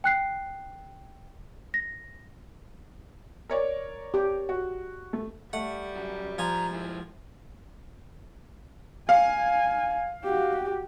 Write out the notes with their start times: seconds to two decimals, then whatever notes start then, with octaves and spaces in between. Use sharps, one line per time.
0.04 G5 F#6 C7
1.74 A#6
3.50 A#4 C#5 D5
4.14 G4
4.49 F#4
5.13 A3
5.53 G3 A3 F#5
5.96 F#2
6.38 C#2 F3 G#5 A#5
6.71 G#3 E4
9.09 F5 G#5
10.24 F#4 G4